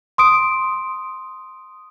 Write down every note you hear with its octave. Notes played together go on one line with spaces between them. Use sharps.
C6 D#6 D7